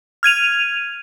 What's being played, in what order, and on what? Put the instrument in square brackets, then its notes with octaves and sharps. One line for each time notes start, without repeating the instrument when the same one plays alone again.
[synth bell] F6 G#6 D#7 F7